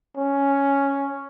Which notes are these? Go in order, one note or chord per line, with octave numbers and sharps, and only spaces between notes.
C#4